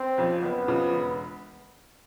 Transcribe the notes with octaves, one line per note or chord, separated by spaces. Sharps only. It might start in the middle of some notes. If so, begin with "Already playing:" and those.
Already playing: C4
F2 C#3 F3
F#1 B3
F2 C#3 F3
E1